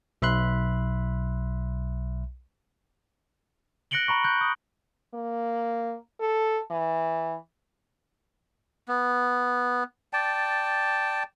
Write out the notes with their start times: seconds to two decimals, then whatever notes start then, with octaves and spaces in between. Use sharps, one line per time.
0.22 B1 E5 B5 C6 F#6
3.91 F#6 A#6 C#7 D7 F#7 G7
4.08 A#5 B5 C#6
4.24 F#6 G6
4.41 D#6
5.14 A#3
6.20 A4
6.71 E3
8.88 B3
10.13 D5 G5 A5